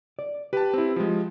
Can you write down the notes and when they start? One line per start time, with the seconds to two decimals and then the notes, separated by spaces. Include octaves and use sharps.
0.19 D5
0.53 G4 B4 A5
0.74 C4 E4
0.96 F3 G#3